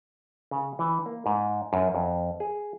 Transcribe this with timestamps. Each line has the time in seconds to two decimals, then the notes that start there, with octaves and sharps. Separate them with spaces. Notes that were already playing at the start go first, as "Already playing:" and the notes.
0.51 C#3
0.79 E3
1.06 A#3
1.26 G#2
1.73 F#2
1.95 F2
2.40 G#4